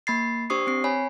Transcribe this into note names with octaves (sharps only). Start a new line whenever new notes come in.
A#3 B5 A6 C7
D4 G4 C5 C#6 D#6 C7
C4 C7
C#5 G#5 B5